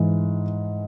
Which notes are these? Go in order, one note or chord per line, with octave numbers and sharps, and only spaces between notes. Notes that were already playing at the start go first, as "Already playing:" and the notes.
Already playing: G#2 E3